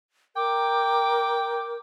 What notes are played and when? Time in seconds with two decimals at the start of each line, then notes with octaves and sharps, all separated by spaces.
0.36 A#4 G5 D6